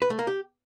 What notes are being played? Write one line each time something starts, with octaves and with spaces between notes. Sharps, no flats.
B4
A3
A#3
G4